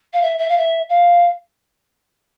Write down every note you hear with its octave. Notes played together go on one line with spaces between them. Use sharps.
F5
E5
E5
F5
E5
F5